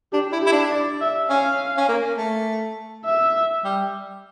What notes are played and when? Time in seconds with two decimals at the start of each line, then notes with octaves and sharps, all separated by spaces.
0.13 D4 G4
0.32 E4
0.42 G4
0.46 E4
0.52 D4
0.71 D5
1.01 E5
1.30 C#4 F5
1.78 C#4
1.89 A#3
2.18 A3
3.06 E5
3.65 G3